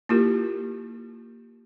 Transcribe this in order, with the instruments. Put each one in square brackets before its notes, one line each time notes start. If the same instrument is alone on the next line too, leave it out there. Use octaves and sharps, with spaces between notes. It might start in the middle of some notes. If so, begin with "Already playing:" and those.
[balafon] A#3 E4 F4 G4 A#4